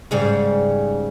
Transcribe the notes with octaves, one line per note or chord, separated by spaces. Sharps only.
G#2 C#3 G3